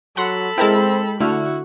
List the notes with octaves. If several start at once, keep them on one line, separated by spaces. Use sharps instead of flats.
F#3 A4 F#5 B5 C6
G#3 C4 E4 A#4 G5 A5
D3 A3 E4 F#4 F6